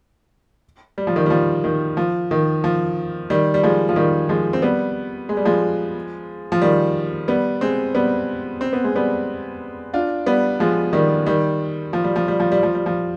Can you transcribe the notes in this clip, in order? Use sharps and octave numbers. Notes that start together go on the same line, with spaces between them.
G3
F3
D#3 G3
G3
F3
D#3
F3
D#3
F3
D#3 G3
G3
F3 G#3
F3
D#3 G3
F3 G#3
C4
G3 B3
G#3
G3
F3 G#3
F3
D#3 G3
G3 B3
G#3 C4
G3 B3
C4
B3
G#3
G3 B3
D4 F4
G3 B3
F3 G#3
D#3 G3
D#3 G3
F3
G3
F3
G3
F3
G3
F3
G3
F3